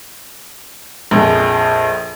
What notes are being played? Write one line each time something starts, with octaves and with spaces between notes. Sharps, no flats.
A#1 F2 G#4